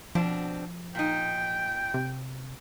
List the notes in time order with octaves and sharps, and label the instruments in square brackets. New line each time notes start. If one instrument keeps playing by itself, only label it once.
[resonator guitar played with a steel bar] B2 C4 D4 [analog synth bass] F3
[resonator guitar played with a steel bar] A#2 D#4 [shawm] G5
[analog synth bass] C3